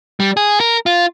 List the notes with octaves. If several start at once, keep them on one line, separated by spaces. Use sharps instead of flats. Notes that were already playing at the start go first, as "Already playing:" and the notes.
G3
G#4
A#4
F4